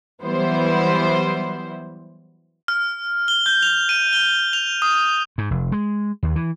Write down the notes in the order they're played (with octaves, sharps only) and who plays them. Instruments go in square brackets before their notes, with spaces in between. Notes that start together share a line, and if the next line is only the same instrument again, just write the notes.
[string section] E3 F#3 G3 B3 E4 C5
[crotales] F6
G7
G6
F7
D#7
G7
F7
D#6
[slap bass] G#2
F1
G#3
D#2
E3